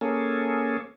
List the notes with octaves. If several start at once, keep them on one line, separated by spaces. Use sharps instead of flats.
A#3 C#4 G#4 A4